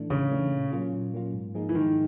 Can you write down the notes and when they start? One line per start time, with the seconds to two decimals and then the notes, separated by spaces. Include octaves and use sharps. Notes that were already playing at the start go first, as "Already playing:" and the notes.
Already playing: A2 E3 A3 D4
0.10 A2 C#3
0.31 E3 A3 D4
0.51 A#2
0.72 F#3 A#3 C#4 F4
0.93 A#2
1.14 F#3 A#3 C#4 F4
1.33 G#2
1.54 F3 A#3 D#4 G#4
1.69 E3
1.75 G#2 D#3